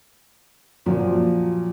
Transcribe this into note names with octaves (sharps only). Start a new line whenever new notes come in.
A#2 F3 F#3